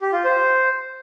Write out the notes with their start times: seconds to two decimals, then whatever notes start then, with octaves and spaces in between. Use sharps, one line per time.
0.01 G4
0.12 F4
0.24 C5